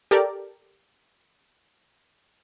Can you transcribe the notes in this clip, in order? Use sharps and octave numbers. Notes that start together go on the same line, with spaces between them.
G4 A4 A#4 D5